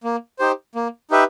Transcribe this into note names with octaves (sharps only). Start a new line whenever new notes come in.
A#3
D#4 G4 C5
A#3
D#4 G4 B4 E5